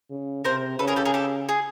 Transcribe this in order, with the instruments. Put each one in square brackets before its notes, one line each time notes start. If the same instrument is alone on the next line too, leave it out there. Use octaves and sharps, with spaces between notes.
[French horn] C#3
[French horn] C3 [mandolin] A#4 C5
[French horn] C#3 [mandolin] A4 B4
[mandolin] G#4 A#4
G4 A4
G#4 A#4
G4 A4
G#4